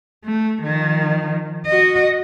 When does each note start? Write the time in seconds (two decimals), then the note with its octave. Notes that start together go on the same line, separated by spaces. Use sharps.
0.24 A3
0.63 D#3 F3
1.66 F#4 D#5